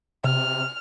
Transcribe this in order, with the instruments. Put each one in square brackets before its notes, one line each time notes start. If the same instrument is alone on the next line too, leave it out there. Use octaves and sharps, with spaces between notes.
[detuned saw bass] C3 [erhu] F6